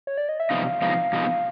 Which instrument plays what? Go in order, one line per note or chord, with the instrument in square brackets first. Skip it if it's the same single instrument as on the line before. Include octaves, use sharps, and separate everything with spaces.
[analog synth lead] C#5
D5
D#5
E5
[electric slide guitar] C3 F3 G#3 B3 D#4 [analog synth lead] F5
[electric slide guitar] C3 F3 G#3 B3 D#4 [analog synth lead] F5
[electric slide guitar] C3 F3 G#3 B3 D#4